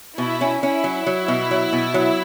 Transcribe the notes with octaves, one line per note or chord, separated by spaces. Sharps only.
B2 E4
C#4
C#4 E4
F#3
F#3
B2
F#3
B2
F#3